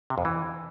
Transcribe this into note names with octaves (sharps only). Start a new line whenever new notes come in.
C3
F2
E3